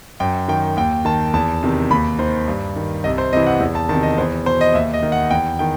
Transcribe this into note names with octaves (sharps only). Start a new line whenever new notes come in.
F#2 G5
D#3 G5
D#2 G5
D#3 A5
E2 A5
C3 D#3
D#2 B5
D#3 C5
G2
D#3
C2 D#5
C5
C3 E3 D#5
F#5
E2
A5
C3 D#3 A5
D#5
E2 C5
B2 C5
D#5
D#2 E5
D#5
D#3
F#5
E2 G5
D#3 G5